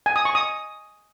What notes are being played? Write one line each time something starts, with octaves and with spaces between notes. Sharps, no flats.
G#5
D#6
C#6
D#6